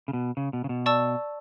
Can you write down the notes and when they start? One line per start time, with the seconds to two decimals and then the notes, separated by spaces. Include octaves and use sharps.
0.08 C#3
0.13 B2
0.37 C#3
0.53 B2
0.64 C#3
0.69 B2
0.86 D5 A5 C#6 E6